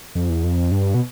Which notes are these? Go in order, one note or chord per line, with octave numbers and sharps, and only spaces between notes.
F2
E2
F2
G2
B2